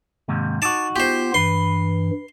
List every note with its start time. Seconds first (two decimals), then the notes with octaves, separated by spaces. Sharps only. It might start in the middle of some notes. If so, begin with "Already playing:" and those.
0.28 D#2 G#2 C3
0.62 D#4 F#4 A5 D6
0.96 B3 F4 G4 C5
1.34 G2 E3 B4 C6